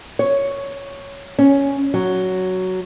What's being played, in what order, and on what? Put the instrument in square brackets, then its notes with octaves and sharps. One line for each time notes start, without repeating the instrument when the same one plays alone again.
[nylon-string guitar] C#5
C#4
F#3